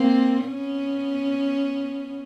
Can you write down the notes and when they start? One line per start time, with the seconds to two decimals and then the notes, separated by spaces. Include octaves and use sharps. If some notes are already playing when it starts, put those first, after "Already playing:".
Already playing: A#3 C4
0.45 B3 C#4